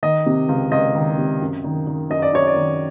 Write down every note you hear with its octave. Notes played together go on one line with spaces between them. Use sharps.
D#3 D#5
C3
C#2
C#2 D#5
D#3
C3
F#2
D#3
D#3
F#2 D#5
D5
F#2 C#5
D5
D#3